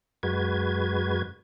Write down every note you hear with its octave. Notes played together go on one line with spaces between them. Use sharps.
F#2 G#3 F#4 B4 G#6